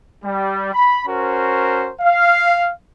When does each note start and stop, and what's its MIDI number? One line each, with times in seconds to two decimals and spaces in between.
0.24 0.73 55
0.73 1.03 83
1.07 1.92 61
1.07 1.92 66
1.07 1.92 70
1.07 1.92 72
2.01 2.70 77